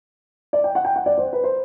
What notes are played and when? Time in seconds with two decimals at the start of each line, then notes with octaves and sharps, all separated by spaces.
0.53 D5
0.64 G5
0.75 F#5
0.85 G5
0.96 F#5
1.06 D5
1.18 C5
1.33 B4
1.44 C5